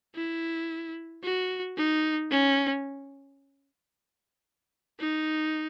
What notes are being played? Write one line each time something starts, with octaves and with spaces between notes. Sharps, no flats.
E4
F#4
D#4
C#4
D#4